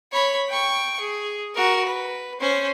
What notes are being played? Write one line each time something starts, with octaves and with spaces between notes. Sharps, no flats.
C#5 B5
G5 C#6
G#4
F#4 A#4
B4
C#4 C5